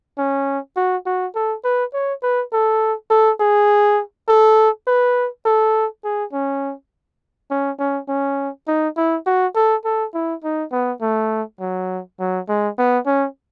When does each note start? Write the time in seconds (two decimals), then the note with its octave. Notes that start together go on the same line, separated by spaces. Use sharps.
0.18 C#4
0.76 F#4
1.06 F#4
1.35 A4
1.64 B4
1.93 C#5
2.22 B4
2.52 A4
3.10 A4
3.40 G#4
4.28 A4
4.87 B4
5.45 A4
6.04 G#4
6.33 C#4
7.51 C#4
7.79 C#4
8.08 C#4
8.67 D#4
8.97 E4
9.26 F#4
9.55 A4
9.85 A4
10.14 E4
10.43 D#4
10.72 B3
11.01 A3
11.60 F#3
12.19 F#3
12.48 G#3
12.78 B3
13.06 C#4